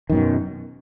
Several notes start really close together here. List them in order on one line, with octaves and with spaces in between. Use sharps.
D#3 F#2 B2